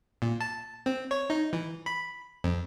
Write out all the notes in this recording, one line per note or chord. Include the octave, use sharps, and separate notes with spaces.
A#2
A5
C4
C#5
D#4
E3
B5
F2